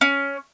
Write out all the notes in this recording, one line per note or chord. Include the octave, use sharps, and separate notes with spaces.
C#4